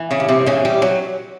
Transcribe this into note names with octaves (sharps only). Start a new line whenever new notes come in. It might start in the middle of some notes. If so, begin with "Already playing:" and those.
Already playing: E3
C#3 C#4
G2
C3 C4
C#3 E3 C#4
G3 G4
F#3